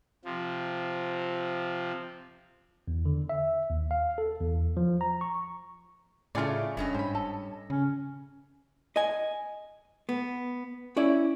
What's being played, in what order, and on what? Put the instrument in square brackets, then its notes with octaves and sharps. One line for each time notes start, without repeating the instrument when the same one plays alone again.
[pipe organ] C3 F3
[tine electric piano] E2
D3
E5
D#2
F5
A4
E2
F3
A#5
C#6
[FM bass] A2 [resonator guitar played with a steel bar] C#3 A3 [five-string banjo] F4 G#4 D5
[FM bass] F#1 [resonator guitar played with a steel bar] G2 C#4 D#5
[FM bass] G#2 [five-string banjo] C5 B5
[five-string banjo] A4
[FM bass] C#3 [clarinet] C#4
[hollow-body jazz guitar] D#5 G#5
B3
C#4 E4 D5